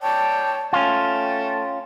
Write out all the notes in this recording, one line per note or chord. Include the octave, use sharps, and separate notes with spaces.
C#5 D5 G5 A5
A3 C#4 F4 G5 A5